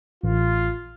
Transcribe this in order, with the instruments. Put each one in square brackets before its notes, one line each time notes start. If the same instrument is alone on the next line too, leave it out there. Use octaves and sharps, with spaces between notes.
[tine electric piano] A1 [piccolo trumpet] F4